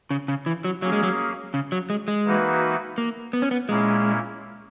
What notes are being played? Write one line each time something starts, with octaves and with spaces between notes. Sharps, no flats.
C#3
C#3
E3
F#3
F#3 A#3 C#4 G#4
G#3
F#3
C#3
F#3
G#3
G#3
E3 A#3 D#4 F#4 B4
A#3
B3
C#4
B3
A#2 G#3 A#3 C#4 E4